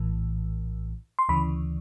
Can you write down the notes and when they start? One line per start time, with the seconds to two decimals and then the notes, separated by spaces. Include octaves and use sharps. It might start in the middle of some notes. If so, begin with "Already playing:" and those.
Already playing: A#1 A2 E3
1.19 C6
1.29 D2 C#3 E3 B5